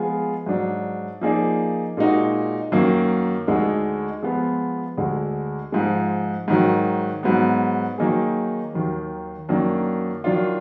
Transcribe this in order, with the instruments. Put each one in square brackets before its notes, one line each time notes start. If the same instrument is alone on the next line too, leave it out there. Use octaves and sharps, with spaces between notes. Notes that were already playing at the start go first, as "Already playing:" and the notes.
Already playing: [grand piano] F3 G#3 B3 F4 G#4
G#2 F#3 D4
F3 A#3 D#4 G#4 D5
A#2 G#3 D#4 F#4
F#2 D#3 A#3
D2 D3 G#3 D#4
F3 G#3 B3 F4
D2 D3 G#3
G#2 F3 G#3
G#2 D#3 F#3
G#2 F#3 B3
D#3 F#3 A#3 D#4 G#4
D#2 D#3 F#3
F#2 D#3 A#3 D4
D#3 F#3 D4 F4